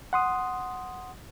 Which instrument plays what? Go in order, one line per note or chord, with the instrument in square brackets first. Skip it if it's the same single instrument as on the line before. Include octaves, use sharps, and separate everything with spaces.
[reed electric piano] F#5 C6 D#6